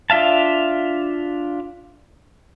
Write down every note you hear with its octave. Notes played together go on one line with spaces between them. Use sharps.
D4 F4 E5 F5 A5